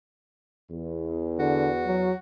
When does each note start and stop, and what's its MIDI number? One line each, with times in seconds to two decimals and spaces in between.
0.71 2.09 40
1.39 1.71 50
1.39 2.17 66
1.86 2.13 54